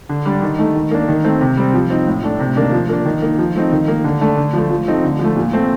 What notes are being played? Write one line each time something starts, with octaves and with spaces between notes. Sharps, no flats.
D3
G3 D4
D#3
A3 D#4
D#3
A#3 D4
D#3
A3 C4
C3
G3 C4
F3
C4 D#4
A2
A3 D4
C3
D#3 A#3 D4
F3
A#3 D4
D#3
A#3 D#4
F3
A3 C4 D#4
D#3
A#3 D#4
D3
A3 D4
D3
F3 A3
F3
A3 C4 D#4
D3
F3 A3
A#2
A3 C4